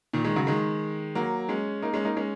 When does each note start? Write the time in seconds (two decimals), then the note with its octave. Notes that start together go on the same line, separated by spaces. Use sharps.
0.13 A#2 D#3
0.25 D#3 G#3
0.36 C#3 F#3
0.47 D#3 G#3
1.15 F#3 A#3
1.49 G#3 C#4
1.82 A#3 D#4
1.94 G#3 C#4
2.05 A#3 D#4
2.17 G#3 C#4